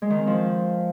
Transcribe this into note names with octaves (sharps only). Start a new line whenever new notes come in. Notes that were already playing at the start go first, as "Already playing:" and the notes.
G#3
D#3
C4
F3